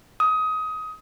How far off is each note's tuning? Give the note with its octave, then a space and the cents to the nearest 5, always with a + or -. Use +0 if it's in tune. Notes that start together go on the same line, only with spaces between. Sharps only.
D#6 +20